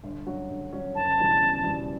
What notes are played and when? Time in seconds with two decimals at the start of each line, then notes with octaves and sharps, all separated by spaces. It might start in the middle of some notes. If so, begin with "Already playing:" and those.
0.04 G1
0.27 G2 F#3 C#4 F#4
0.50 G1
0.72 G2 F#3 C#4 F#4
0.95 F#1 A5
1.18 E2 B2 G3
1.42 F#1
1.64 E2 B2 G3